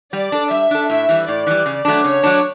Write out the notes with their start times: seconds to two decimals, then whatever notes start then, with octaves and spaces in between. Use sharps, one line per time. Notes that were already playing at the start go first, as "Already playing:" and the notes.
0.13 G3 D5
0.32 D4 A4
0.51 G3 E5
0.71 D4 A4
0.90 A2 E5
1.09 E3 G3
1.28 A2 D5
1.47 E3 G3
1.66 C#3
1.85 F#3 A3 D4
2.04 C#3 C#5
2.23 F#3 A3 D4